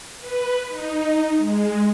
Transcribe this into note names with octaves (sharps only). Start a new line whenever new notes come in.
B4
D#4
G#3